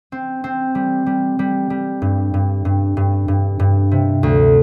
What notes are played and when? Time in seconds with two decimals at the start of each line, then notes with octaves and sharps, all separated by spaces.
0.12 C4
0.44 C4
0.75 G3
1.06 G3
1.39 G3
1.70 G3
2.02 G2
2.34 G2
2.65 G2
2.97 G2
3.28 G2
3.59 G2
3.91 C3
4.23 D2